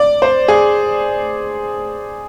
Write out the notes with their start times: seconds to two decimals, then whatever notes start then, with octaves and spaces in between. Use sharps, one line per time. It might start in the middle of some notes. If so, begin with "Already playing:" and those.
Already playing: D5
0.22 C5
0.48 G#4